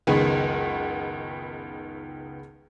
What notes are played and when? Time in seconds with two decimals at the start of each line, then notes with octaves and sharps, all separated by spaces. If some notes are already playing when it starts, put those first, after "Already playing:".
0.07 F#1 C#2 D#3 B3 G#4